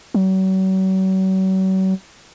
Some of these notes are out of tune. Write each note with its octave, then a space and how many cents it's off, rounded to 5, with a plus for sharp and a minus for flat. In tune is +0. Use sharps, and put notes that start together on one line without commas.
F#3 +40